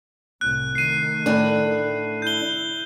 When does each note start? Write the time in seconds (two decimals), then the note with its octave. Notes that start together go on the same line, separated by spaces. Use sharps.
0.41 C2 A2 F#6
0.75 D#3 A3 C7 D#7
1.26 A2 D4
2.22 E4 G6 G7